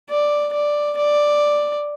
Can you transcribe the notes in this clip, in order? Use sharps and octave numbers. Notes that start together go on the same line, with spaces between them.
D5
D5
D5